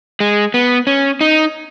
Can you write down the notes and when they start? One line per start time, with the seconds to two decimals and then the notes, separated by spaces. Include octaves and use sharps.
0.20 G#3
0.54 B3
0.87 C#4
1.21 D#4